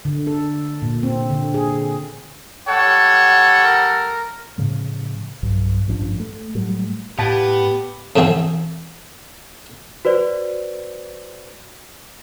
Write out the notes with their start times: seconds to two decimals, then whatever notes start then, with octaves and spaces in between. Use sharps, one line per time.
0.05 D3
0.27 A4
0.82 A#2
1.03 C4
1.30 D3
1.54 G#4
2.68 G3 A4 C#5 F#5
3.64 A#4
4.58 A2 C#3 F3
5.43 B1 G2
5.88 A1 G2 F3 D4
6.19 A3
6.55 A2 F#3 G3 A3
7.19 A2 B3 G4 F5 A5
8.16 F2 G#2 B2 E3 C4
10.05 F#4 B4 C5 D5